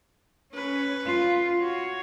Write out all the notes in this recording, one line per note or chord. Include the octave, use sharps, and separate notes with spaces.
C#4 B4
F4
F#4 C#5